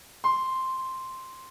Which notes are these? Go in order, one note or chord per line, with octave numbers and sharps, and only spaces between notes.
C6